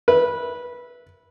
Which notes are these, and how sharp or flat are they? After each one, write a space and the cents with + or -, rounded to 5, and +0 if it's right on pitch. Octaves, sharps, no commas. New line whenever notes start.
B4 -15 E5 +0